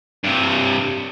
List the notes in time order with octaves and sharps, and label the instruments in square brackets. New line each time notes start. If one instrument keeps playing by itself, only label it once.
[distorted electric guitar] G2 C3